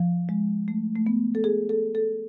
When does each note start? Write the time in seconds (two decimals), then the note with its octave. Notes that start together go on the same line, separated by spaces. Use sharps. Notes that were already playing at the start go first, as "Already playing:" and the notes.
Already playing: F3
0.29 G#3
0.68 A3
0.96 A3
1.07 B3
1.35 A4
1.44 G#4
1.69 A4
1.95 A4